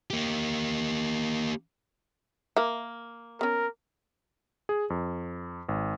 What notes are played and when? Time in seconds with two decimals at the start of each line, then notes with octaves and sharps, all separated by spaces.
0.10 A#3 G4
2.56 A#3 A#4 E5
3.41 B3 C#4 A#4
4.69 G#4
4.90 F2
5.69 G#1